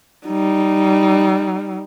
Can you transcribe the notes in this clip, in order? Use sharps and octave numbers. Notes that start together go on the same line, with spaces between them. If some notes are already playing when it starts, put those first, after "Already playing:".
G3 D#4